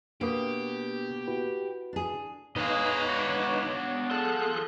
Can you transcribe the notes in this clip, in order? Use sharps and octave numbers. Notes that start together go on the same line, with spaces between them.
B2 A#3 D4 G4 B4 D#6
E4 F#4 B4
D4 G#4
B3 D#4 G#4 B4 C#5 D#5 F5
D4 F#4
F4 G#4 A4 A5 F#6